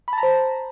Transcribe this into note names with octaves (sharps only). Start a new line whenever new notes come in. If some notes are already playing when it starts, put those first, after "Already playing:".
B5
A5
A#5
C5